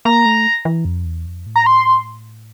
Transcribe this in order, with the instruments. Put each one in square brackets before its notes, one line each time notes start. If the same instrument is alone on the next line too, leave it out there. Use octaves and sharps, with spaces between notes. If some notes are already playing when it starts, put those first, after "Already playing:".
[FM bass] A#3 [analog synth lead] A#5
[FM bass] A3
E3
F2
E2
F2
A2
[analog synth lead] A#5
C6